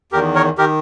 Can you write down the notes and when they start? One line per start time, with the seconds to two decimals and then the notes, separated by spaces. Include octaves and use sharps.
0.12 E2 G4 A#4
0.16 D#3
0.35 A#4 C#5
0.58 D#3 G4 A#4